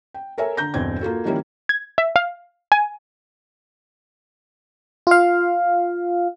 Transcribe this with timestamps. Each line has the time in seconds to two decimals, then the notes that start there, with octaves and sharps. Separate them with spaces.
0.14 G5
0.38 A4 A#4 C#5 E5 G#5
0.57 D3 A#5 G6 A#6
0.74 G1 E2 B2 C4 G#6
1.01 A#3 F4 F#4 A4
1.25 D#3 F3 G3 A#3 C#4 E4
1.69 G#6
1.98 E5
2.16 F5
2.72 G#5
5.07 F4 F5